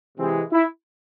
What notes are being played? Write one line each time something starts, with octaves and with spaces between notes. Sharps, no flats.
C3 E3 G#3 C4
E4